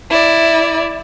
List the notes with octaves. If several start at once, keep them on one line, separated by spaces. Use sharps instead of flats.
E4 D5